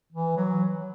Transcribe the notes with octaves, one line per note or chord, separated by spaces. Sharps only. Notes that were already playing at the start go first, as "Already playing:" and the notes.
E3
F#3